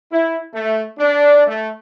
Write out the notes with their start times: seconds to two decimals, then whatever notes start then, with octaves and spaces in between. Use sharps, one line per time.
0.12 E4
0.54 A3
0.98 D4
1.47 A3